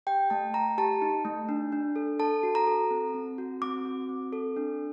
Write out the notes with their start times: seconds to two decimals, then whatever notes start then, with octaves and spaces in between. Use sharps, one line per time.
0.07 G4 G5
0.30 A3 A5
0.54 A3 A#5
0.78 G4 A5
1.02 D#4
1.25 A3
1.49 D4
1.72 D4
1.96 A4
2.19 A4 A5
2.43 F#4
2.55 A#5
2.67 A4
2.91 C4
3.14 C4
3.38 F#4
3.62 C4 D6
3.85 F#4
4.09 C4
4.33 A4
4.57 D4